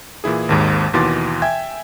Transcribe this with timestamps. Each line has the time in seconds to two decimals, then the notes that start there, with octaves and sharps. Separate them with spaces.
0.24 A#2 E3 E4 G#4
0.49 G#1 D#2 G#2
0.94 D#2 B2 E3 C6 D6 A6
1.42 E5 G5 G#5 G#6